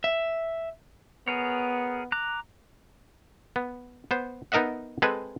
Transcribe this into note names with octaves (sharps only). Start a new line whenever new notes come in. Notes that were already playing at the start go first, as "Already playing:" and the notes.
E5
B3 G#4 A#4 C#5
A#5 D6 F#6
B3
B3 C5
B3 D#4 A#4 D#5 E5 F#5
G#3 C4 G#4 A4 B4